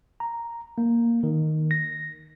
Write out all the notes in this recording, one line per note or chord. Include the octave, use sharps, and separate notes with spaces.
A#5
A#3
D#3
A#6